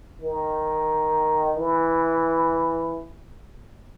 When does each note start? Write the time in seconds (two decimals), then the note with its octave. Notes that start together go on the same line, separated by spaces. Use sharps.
0.22 D#3
1.57 E3